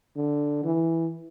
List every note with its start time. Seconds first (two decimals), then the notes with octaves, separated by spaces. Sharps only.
0.16 D3
0.64 E3